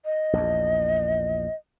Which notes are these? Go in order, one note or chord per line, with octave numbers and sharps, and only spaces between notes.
D#5
A#1 E2